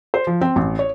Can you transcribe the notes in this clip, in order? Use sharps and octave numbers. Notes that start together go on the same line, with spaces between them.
C5
F3
C4
A1
C#5